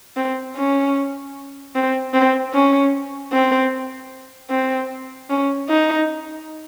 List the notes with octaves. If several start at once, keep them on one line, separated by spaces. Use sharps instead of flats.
C4
C#4
C4
C4
C#4
C4
C4
C#4
D#4